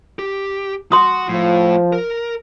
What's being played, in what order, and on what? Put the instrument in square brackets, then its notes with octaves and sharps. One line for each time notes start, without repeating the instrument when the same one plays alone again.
[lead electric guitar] G4
[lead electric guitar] F#4 F#5 [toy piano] C6 D#6
[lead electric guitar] A2 [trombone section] F3
[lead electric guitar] A#4